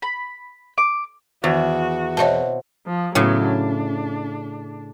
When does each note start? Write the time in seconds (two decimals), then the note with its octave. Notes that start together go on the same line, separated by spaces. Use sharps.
0.02 B5
0.78 D6
1.44 E2 D#3 F#4
2.17 B2 C4 F#4 C#5 E5 A5
2.86 F3
3.15 A2 C#3 F#3 B3
3.47 D4